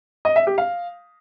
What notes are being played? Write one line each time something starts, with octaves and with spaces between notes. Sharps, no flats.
D#5
E5
G4
F5